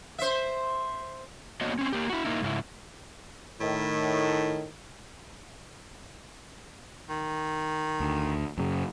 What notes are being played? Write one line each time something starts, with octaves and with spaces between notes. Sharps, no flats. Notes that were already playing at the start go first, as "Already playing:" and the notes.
C5 E5
A#3 B3 D4 F#4 C#5 D#5
C4 C#4
A#3 G4
E4 F#4
A#3 D#4 E4
G#2 C#3 E4
A2 D#3
D#3
D2
F#2 C#3